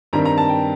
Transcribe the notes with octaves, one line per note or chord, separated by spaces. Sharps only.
G2 D#3 G3 C4 A#5
A#5
A5
G5